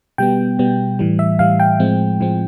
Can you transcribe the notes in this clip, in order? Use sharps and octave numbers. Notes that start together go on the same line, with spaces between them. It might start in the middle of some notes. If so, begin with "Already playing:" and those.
B2 G3 B3 G5
B2 G3 B3
A2 E3 G3
E5
A2 E3 G3 F5
G5
A2 F3 G#3 C4
A2 F3 G#3 C4